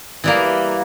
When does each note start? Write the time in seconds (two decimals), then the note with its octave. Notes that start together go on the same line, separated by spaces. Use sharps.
0.24 E3 G3 A#3